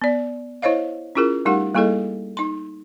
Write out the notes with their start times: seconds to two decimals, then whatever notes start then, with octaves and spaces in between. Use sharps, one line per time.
0.02 B3 D5
0.62 E4 C5 C#5 D#5 F5
1.15 C#4 E4 F4 G#4 A#4
1.45 G3 A3 D#4 G4 A#4 F#5
1.74 G3 A#3 E4 G#4 A4 D#5
2.37 D#4 C6